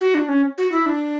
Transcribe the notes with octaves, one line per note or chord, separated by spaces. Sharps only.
F#4
D4
C#4
F#4
E4
D4